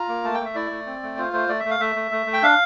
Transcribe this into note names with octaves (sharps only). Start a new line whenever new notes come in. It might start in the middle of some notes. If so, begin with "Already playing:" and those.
Already playing: F4 A#5
A#3
A3 A5
G5
A3 E5
E4 D5
A3
C4
A3
F4 C5
A3 C5
A3 D5
E5
A3
F5
A3 E5
A3
A3
A3
G5
D4 F5